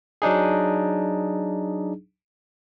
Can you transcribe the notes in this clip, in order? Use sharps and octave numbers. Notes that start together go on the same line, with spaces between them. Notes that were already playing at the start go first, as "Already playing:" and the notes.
F#3 D4 D#4 G#4